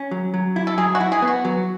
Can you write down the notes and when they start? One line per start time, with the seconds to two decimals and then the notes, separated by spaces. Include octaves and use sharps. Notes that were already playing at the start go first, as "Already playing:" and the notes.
Already playing: C#4
0.11 F#3
0.34 F#3
0.56 E4
0.67 A4
0.78 F#3 G#4
0.95 F#4
1.01 E4
1.12 G#4
1.22 B3
1.28 F#4
1.45 F#3